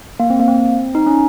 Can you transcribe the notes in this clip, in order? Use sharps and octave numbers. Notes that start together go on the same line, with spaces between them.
A#3
C4
A#3
C4
D#4
C#4